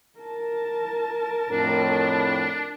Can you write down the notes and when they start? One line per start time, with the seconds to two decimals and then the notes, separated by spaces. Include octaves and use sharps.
0.19 A#4 A5
1.50 F2 A2 D4